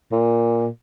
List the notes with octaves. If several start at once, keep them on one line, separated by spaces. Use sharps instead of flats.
A#2